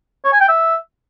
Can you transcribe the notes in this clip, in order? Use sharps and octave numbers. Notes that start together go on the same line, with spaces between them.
C#5
G#5
G5
E5